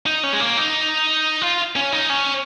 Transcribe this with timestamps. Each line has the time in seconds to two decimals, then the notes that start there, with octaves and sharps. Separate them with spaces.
0.06 D#4
0.23 C#4
0.33 G#3
0.40 A#3
0.57 D#4
1.42 F4
1.76 C#4
1.92 D#4
2.10 C#4